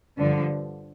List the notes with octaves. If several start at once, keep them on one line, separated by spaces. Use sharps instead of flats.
G2 D3 F3